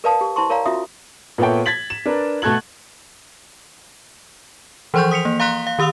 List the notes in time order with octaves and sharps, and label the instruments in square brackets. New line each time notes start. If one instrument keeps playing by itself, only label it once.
[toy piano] A#4 B4 D5 F5 A5 D#6
G4
E4 C5 A5 C6 C#6
A#4 C#5 D5 F5 A#5
C#4 F4 F#4 E5 D#6
[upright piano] A#2 B3 A4 C#5 E5 G5
G#6 A6 B6 F#7
E7
D4 A#4 B4
B2 A3 A4 F#6 G#6 F#7
[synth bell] E3 F3 C5 C6 C#6 G6
D#6 B6 C#7 F7
A#3
F5 A#5 C6 F#6 B6 G7
F5
D#3 G4 D#6 E6 F7